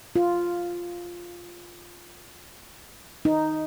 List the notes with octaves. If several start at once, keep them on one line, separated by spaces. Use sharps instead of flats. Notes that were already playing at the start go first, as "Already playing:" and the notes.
F4
D#4